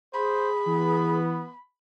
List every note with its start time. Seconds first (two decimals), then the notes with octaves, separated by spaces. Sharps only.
0.14 G#4 C5 B5
0.67 E3 B3